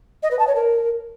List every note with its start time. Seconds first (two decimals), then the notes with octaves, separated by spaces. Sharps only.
0.23 D#5
0.31 B4
0.39 A5
0.47 C#5
0.55 A#4